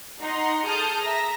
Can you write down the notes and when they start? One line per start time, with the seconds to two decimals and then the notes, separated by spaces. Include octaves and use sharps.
0.20 D#4 F#5 A#5 C6
0.65 G#4 A4 A5 D#6 F6 G6
1.01 E5 A#5 A#6